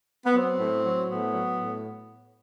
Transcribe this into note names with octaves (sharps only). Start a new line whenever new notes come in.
B3
F#3 C4
A2
F#3
A2 B3
F#3
A2